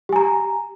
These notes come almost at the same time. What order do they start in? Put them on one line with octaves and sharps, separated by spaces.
G4 G#5 A#5